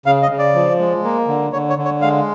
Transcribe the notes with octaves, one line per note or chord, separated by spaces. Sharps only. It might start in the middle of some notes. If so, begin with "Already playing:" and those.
C#3 F5
D#5
C#3
D5
F3
G#3
A#3
D3
D3 C#5
C#5
D3
C#5
G#3 F5